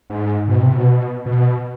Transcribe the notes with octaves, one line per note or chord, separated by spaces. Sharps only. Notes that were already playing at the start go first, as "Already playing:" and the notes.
G#2
B2
C3
B2
B2